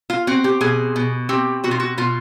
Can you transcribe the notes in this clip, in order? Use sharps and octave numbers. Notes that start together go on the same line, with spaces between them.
F4
C4 F#4
G4
B2 G#4
B2
C4 G4
B2 F#4
F4
F#4
B2 F4